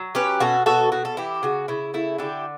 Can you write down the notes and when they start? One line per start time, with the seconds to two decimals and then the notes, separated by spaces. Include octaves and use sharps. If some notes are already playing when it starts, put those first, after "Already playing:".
Already playing: F#3
0.15 C#4 G4 B4
0.40 B2 F#4 A4
0.66 B2 F#4 A4
0.92 B2 F#4
1.05 A4
1.17 E3 E4 G4
1.43 C#3 F#4
1.68 C#3 E4
1.94 A3 E4
2.18 D3 E4 G4